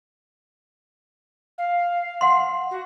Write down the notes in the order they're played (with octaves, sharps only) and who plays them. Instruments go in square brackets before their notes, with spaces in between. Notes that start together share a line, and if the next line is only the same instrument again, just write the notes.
[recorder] F5
[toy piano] F#5 C6
[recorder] F#4